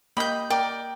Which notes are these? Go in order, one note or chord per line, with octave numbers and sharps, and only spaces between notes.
A#3 G4 D#5 B5 G6
A#4 D5 G5